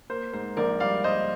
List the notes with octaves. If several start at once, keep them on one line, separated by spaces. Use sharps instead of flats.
A#3 C5
G#2 C5
A#1 A#4 D5
G3 D5 F5
A#3 C5 D#5